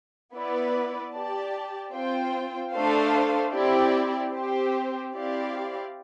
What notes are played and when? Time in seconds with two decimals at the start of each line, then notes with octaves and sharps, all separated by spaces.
0.34 B3 E4 B4 D5
1.13 G4 D5 A5
1.93 C4 F4 C5 G5
2.74 A3 D4 A4 C5 F5
3.53 C4 E4 G4 D5
4.33 C4 G4 C5
5.12 C4 E4 G4 D5 F5